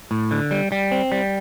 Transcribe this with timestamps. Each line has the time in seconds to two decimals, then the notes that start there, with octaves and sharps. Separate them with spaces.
0.11 A2
0.31 D3
0.51 G3
0.72 G3
0.91 C4
1.12 G3